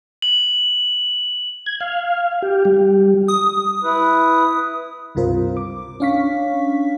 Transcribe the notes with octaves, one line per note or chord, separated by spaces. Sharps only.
F#7
G#6
F5
G4
G3
D#6
E4 B4
C#2 G2 C3 F4 A#4 C5
D6
C#4 D4 F5 C#6 B6